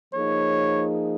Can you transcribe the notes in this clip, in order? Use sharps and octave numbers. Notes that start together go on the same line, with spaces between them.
F3 A#3 D#4 G#4 C#5